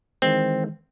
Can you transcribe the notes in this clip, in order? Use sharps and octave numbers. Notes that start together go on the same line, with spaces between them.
D#3 E3 G#3 C4